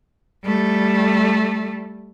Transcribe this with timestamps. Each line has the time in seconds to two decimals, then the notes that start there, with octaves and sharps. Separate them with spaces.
0.45 G3 A3